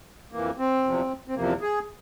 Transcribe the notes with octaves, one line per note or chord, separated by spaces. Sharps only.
F2 E3 A#3
C4
E2 C3 F3
C4
E2 C3 F3 A#3
G#4